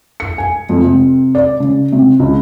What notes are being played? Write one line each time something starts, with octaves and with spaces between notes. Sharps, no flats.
C#7
G#5
F2
C3
D5
C#3
C3
C#2